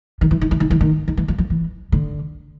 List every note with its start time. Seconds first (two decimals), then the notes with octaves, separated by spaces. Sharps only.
0.21 D#3
0.31 E3
0.41 D#3
0.51 E3
0.60 D#3
0.70 E3
0.81 D#3
1.08 D#3
1.17 E3
1.28 F3
1.38 F3
1.50 E3
1.92 D3